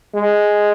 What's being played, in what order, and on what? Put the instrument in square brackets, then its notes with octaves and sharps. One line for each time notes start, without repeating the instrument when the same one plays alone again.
[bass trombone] G#3